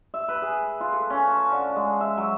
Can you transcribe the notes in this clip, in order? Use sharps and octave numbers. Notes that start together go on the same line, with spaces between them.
E5
B4
G#4
F4
A4
C#4
A5
D3
G#3
E5
F#3